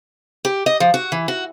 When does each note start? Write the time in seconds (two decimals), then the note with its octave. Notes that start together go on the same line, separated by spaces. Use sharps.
0.45 G4
0.66 D#5
0.80 F3
0.94 F#4
1.12 E3
1.28 F#4